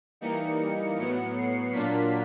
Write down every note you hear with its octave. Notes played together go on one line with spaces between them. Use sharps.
E3 G3 A#3 D#4 C#7
C#7
A2 F#3 B3 C#7
C7
A#2 F#3 A#3 D4 F4 B6